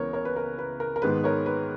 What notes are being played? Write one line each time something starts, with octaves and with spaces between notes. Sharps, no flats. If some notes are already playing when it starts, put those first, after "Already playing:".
Already playing: C#2 C#3 E3 B3 A#4 C#5
A#4 C#5
B4
A#4
B4
A#4
A#4
G#2 D#3 G#3 B3 B4
A#4 C#5
B4